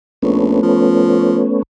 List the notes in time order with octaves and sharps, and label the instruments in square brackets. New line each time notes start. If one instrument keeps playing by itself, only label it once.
[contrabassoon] A#1 [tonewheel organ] A3 B3 C#4
[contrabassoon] F3